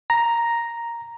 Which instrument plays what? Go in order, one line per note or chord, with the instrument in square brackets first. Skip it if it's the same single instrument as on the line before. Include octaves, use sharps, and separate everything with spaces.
[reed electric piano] A#5